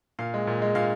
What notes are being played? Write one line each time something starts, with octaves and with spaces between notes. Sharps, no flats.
A#2 F5
G#3
A#2
G#3
A#2 F5